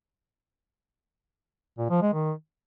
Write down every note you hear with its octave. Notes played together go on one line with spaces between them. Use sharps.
A#2
F3
G#3
D#3